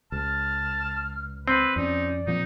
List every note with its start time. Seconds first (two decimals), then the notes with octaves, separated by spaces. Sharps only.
0.12 C#2 A5 F6
1.48 C4 B4
1.76 F2 C#4 D#4 D5
2.27 A#2 F3 C4 D#4